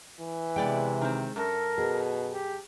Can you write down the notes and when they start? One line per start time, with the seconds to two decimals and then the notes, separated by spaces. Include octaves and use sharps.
0.20 E3
0.56 C3 G#3 B3 D5 G5
1.01 D#3 C4
1.36 F#2 A4 A#4
1.78 B2 G#4
2.30 G4